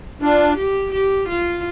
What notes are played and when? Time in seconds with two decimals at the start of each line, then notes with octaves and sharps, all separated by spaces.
0.22 D4 F4
0.57 G4
0.93 G4
1.29 F4